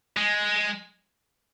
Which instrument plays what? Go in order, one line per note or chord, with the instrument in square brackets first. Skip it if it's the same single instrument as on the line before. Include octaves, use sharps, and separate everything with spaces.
[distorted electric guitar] G#3